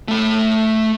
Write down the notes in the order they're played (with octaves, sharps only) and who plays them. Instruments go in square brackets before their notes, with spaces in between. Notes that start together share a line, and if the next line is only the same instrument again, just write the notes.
[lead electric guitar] A3 B5